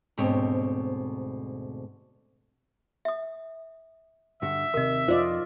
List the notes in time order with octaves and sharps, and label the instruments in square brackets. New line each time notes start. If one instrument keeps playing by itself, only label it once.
[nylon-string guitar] D2 G#2 B2 C4 C#5
[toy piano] E5 D#6
[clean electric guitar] G2 D3 F#4 [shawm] E5
[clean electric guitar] D#2 C3 [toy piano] A#4 D#5
[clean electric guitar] F2 [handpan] F4 D5 D#5 [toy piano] C5